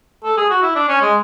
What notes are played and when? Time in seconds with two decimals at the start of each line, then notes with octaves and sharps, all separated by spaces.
0.24 A4
0.38 G#4
0.50 F#4
0.62 E4
0.76 D4
0.89 C#4
1.01 G#3